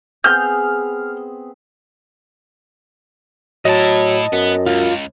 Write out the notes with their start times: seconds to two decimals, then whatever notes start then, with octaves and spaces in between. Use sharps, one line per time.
0.24 B3 C4 G#4 F6 G6
3.65 A2 F#3 E4 D#5 A5
4.33 F#2 B3
4.66 C#2 F4